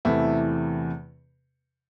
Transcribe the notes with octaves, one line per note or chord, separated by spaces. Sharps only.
E2 C3 E3 A3 E4